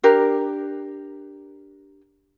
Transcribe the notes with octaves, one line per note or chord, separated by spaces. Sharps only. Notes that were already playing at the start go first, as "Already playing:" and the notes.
D4 G4 A#4